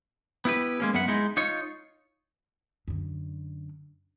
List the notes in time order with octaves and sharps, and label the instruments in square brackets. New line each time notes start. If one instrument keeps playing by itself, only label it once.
[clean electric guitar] B3 E4 G4 B4
G#3 A#3 C#4
F#2 B3 E5 F#5
G#3 D#4 E4
D#4 F4 C#5
[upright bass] F#2 D3